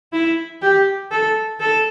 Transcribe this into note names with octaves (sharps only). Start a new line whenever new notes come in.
E4
G4
A4
A4